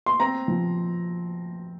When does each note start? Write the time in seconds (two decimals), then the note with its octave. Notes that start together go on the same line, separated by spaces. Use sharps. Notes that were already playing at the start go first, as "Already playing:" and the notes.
0.06 C6
0.20 C4 A#5
0.48 F3